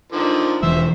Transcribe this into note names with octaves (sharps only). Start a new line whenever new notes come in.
D3 D#3 F3
E1 E3 F3 C5 E5